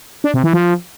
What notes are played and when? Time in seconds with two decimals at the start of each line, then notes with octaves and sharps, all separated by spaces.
0.24 D4
0.34 C3
0.44 E3
0.53 F3